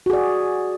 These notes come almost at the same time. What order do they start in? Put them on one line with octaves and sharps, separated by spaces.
F#4 G#4 D5